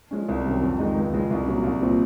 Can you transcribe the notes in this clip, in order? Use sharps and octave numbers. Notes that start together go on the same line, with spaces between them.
F3 G#3 C#4
C2
C3 D#3 F#3 C#4
F2
D#3 G#3 D#4
C#2
C#3 F3 G#3
C2
A#2 F#3 A#3 C#4
C2
A#2 F3 C4